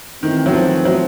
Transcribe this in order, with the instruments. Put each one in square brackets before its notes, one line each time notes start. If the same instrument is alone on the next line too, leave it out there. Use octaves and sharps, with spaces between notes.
[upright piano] D#3 [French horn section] E3 A3 C4 E4
[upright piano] F#3
F3
F#3
F3